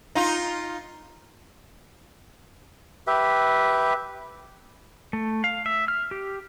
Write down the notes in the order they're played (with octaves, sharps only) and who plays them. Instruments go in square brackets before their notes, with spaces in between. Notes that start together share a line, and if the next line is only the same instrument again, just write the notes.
[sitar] D#4 F4
[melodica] G4 B4 E5
[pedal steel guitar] A3
F5
E5
F6
G4